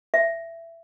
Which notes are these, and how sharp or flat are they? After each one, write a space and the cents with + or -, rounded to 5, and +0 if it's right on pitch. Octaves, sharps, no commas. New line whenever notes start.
E5 +15